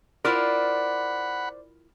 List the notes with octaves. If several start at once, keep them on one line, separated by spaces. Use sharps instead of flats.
E4 F4 A#4 C5 D5 F#5 B5